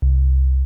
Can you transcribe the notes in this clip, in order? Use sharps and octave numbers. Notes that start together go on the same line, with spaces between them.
C2